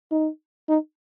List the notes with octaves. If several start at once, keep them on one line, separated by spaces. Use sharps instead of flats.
D#4
D#4